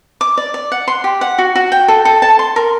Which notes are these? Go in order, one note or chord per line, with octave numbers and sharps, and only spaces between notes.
D6
D5
D5
F#5
C6
G4
F#5
F#4
F#4
G5
A4
A4
A5
C6
A#4